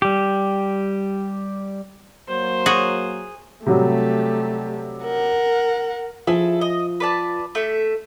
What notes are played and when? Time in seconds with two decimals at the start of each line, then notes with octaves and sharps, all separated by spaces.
0.02 G3 G4
2.29 F#3 A#3 C5
2.66 F#4 G#4
3.66 C3 F#3 G3 A3 G4
5.04 A#4 F#5
6.27 F3 E4 G#4 A4
6.61 D#5
7.00 B4 D5 A5
7.55 A3 E5